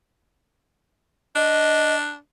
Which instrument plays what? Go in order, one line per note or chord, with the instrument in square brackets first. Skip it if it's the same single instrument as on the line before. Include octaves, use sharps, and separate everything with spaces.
[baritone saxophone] D4 [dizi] D#5